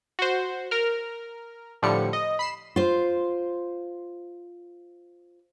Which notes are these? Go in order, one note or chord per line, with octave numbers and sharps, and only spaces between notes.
F#4 C5
A#4 F6
A2 D3 F3 G3 C#7
D#5
B5 C7 E7
F4 C5